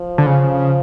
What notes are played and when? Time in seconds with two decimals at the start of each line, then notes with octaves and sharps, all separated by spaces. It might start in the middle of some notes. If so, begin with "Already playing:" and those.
Already playing: F3
0.18 D3
0.26 C#3